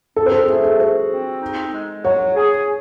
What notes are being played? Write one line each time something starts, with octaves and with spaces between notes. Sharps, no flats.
C4 A4
C5
A4
A3 G#4
A4
F#4 C5
C4
D#4
G#3
F#3 C#5
G#4